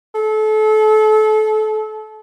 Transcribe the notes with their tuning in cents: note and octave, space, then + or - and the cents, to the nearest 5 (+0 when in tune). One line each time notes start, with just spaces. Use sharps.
A4 -30